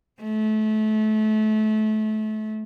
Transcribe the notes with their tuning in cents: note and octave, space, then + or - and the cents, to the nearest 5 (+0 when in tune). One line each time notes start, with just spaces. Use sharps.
A3 -25